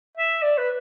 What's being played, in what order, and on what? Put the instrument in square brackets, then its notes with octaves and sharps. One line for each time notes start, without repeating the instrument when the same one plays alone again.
[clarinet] E5
D5
B4